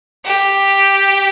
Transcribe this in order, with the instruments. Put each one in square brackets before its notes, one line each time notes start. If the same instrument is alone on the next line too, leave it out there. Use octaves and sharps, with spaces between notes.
[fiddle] G4